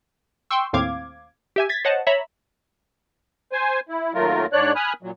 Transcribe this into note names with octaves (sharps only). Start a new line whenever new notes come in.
G5 C6 C#6 E6
D#2 A2 C4 F5 D6 G#6
G4 E5 G#5
G#6 A6 B6
C5 C#5 D#5 F#5 A5
C#5 E5 A#5 B5
C5 G#5
E4
D#2 F#3 A3 F4 A#4
G#2 D4 C#5 D5 F#6
G#5 B5 D#6 F6 F#6
A#2 F#3